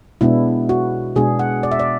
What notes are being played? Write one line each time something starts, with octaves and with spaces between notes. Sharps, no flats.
B2 G#3 B3 D4 E4
F#4
B2 G#3 B3 D4 G#4
F#5
D5
E5
D5